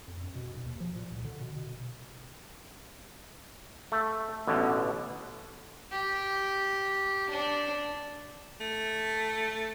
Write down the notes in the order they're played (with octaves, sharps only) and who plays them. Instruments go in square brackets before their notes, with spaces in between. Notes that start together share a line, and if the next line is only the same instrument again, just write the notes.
[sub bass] F2
F#2
B2
B1
D#2
F3
A#2
C2
D3
B2
B2
[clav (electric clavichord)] A3
A1 B2 D3
[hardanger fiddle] G4
D4
[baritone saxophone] A3